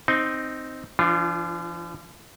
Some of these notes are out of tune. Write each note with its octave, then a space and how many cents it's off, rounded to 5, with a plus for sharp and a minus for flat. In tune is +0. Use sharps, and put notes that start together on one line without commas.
C4 +0 D#4 +0
F3 -45 D4 +0 F4 -5